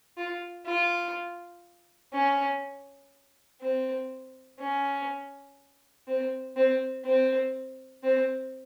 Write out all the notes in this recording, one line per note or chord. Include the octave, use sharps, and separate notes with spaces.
F4
F4
C#4
C4
C#4
C4
C4
C4
C4